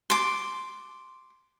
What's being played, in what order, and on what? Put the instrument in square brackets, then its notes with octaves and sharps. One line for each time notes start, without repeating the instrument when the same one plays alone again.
[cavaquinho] C6 D6